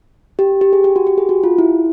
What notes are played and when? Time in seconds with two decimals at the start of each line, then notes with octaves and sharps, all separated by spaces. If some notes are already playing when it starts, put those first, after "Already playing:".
0.39 G4
0.61 G4
0.73 G#4
0.84 G4
0.96 F#4
1.07 G4
1.18 G#4
1.29 F#4
1.44 F4
1.58 E4